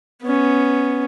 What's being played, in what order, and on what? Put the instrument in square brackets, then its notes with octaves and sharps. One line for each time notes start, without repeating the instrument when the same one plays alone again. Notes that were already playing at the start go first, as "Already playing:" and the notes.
[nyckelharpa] B3 C#4